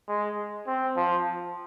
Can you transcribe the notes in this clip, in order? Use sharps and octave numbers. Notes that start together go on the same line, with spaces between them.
G#3
C4
F3